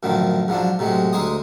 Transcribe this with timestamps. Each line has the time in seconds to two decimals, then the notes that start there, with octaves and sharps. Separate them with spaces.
0.03 F#2 A2 D3 D#3 F3
0.48 G#2 F3 F#3 D4
0.79 A2 C3 F#3 G#3
1.13 D2 G#3 D#4 C5 G#5 D#6